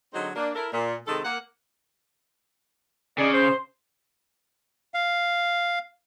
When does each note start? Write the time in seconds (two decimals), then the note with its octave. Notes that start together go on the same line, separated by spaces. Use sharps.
0.14 D3 F#3 G#3 C4 D#4 C5
0.36 A#3 D4
0.55 E4 A4 A#4
0.73 A#2
1.08 C3 D#3 G#3 A4
1.25 A#3 F#5
3.18 C#3 D#4 D5
3.33 C5
4.94 F5